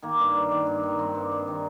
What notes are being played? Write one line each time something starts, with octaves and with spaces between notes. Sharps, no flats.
D#3 A#3
G2
G2
D#3
G2
D#3
G2 C4
G2
G2
D#3